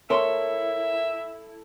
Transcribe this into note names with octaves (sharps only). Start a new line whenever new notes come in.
E4 A4 A#4 C#5 E5 C6